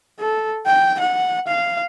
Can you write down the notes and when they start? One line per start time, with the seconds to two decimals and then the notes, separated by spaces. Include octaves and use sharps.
0.20 A4
0.66 G5
1.00 F#5
1.47 F5